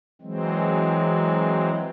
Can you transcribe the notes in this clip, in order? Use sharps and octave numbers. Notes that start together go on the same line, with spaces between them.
E3 F#3 G#3 C4